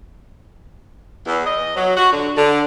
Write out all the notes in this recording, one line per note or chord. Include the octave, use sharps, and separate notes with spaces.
E2
D#5
F#3
F#4
D3
D3